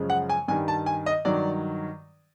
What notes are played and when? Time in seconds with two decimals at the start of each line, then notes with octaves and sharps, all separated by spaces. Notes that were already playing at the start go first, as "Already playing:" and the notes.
Already playing: F#2 C#3 F3 G#3
0.10 F#5
0.30 G#5
0.48 G2 D#3 G3 G#5
0.68 A5
0.86 G#5
1.06 D#5
1.25 G2 D#3 F#3 D5